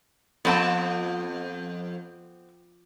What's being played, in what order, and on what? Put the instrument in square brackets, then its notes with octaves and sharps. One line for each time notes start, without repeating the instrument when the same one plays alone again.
[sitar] F2 [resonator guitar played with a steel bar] B3 C4 A5